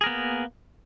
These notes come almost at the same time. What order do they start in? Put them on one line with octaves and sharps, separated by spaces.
G#4 A#4 B3 A#3